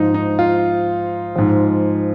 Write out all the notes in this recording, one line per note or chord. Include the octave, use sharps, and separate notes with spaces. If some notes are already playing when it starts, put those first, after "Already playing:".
Already playing: G#2 F3 D#4
D#4
F4
G#2 F3